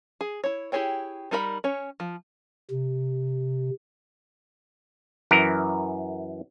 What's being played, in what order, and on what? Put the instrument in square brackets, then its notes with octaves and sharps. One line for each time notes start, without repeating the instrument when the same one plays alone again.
[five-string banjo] G#4
E4 C#5
E4 G4 G#4 C#5 G5
G3 D#4 A#4 E5 B5
C#4 C#5
F3
[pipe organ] C3
[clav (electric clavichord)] F#2 E3 A#4